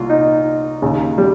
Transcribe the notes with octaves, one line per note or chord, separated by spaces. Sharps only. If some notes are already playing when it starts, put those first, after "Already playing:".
Already playing: C2 A#2 F4
D#4
D#2 C#3
G3